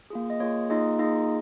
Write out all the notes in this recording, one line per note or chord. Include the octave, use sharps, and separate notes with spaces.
A#3 F4 G#4
D#5
A#3 F4 G#4 C#5
A#3 D#4 F4 G#4 D#5
A#3 D#4 F4 G#4 D#5